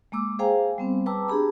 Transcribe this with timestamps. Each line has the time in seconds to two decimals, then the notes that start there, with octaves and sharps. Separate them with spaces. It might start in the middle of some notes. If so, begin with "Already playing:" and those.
0.12 G#3 A#3 D6 E6
0.39 G#4 C5 F5 G5 G#5 A#5
0.78 G3 B3 C4
1.06 B4 G5 A5 A#5 D6 E6
1.29 D4 G4 G#4 A#5 B5